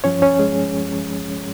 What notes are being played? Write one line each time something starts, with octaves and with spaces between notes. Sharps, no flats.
G2 F3 C#4 C#5
C#4 C#5
G#3 G#4